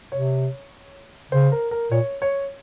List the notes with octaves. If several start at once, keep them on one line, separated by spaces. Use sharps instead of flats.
C3 C#5
C#3 C5
A#4
A#4
A#2 C#5
C#5